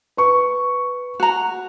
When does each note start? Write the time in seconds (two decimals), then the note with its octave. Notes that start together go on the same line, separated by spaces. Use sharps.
0.17 B4 C#6
1.20 F#4 A#5